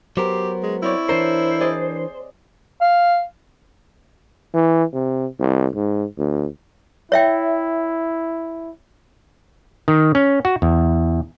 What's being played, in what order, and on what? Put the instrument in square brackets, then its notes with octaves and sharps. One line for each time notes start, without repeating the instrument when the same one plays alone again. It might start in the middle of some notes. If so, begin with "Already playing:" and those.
[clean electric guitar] F#3 B3 A#4 [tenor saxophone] G4 [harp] C5
[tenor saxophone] G#3
[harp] C4 C#5 D5 [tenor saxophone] E4
[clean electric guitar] E3 D4 A#4 [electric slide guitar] C5
[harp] G#4 D5 D#5
[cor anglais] F5
[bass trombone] E3
C3
C2
G#2
D2
[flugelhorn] E4 [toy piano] C#5 E5 G5
[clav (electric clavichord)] D#3
C#4
F#4
E2